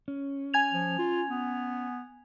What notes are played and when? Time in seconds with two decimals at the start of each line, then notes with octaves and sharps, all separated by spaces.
0.08 C#4
0.54 G#5 G#6 F7
0.73 F3
0.98 F4
1.29 B3